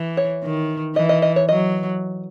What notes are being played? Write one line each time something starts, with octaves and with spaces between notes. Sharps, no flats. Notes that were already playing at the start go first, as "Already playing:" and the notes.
Already playing: E3
C#5
D#3
E3 D#5
D#5
D#5
C#5
F#3 D#5